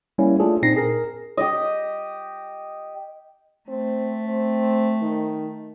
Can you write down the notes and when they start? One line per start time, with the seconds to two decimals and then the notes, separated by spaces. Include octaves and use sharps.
0.18 G3 A#3 C#4 E4
0.40 A3 D4 F4 G#4 A4
0.63 A#2 C4 D#4 A#6 C7
0.76 G#4 A#4
1.37 G4 D#5
3.69 A3 C4
4.27 C4
5.02 D#3